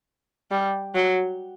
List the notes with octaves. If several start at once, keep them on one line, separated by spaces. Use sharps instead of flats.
G3
F#3